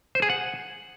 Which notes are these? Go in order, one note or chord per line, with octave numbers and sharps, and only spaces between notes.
C5
G#4
F#5